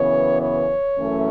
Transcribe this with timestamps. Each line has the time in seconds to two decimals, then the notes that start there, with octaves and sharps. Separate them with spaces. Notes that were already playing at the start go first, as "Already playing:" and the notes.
Already playing: F#2 C#3 E3 B3 C#5
0.40 C#5
0.97 F#2 E3 A3 C#4